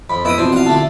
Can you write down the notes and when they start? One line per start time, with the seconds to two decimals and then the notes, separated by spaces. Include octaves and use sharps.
0.10 F2 B5
0.25 B3 E4 D#5 D#6 D7 D#7
0.38 B2 E3 F3 C4 D4
0.52 F5 F#5
0.66 D3 A3 A5